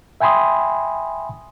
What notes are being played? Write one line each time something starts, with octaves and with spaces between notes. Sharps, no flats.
E5 G5 G#5 B5 C6 D#6